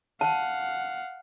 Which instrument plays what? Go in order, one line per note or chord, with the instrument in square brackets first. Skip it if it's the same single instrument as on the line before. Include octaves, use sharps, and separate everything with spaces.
[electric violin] F5 F#5 [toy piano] A5